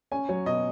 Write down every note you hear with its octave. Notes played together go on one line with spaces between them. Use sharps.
C#4 G#5
F#3 C#5
B2 D#5